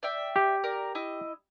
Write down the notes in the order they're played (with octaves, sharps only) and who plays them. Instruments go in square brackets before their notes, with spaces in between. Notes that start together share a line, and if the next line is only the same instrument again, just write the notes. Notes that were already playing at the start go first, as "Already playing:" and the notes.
[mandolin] D5 E5 G5
[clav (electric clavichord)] G4
[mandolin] A#4 D5
E4 D#5